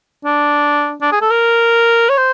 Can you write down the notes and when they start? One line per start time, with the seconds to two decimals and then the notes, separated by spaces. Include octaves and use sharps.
0.24 D4
1.02 D4
1.12 G#4
1.21 A4
1.31 A#4
2.09 C#5
2.17 C5